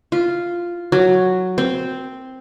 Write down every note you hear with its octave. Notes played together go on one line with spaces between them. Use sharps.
F4
F#3
C4